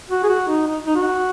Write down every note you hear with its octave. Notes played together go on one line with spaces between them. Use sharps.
F#4
G#4
F#4
D#4
D#4
D#4
F#4